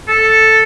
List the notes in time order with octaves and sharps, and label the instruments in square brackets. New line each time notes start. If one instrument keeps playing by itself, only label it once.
[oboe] A4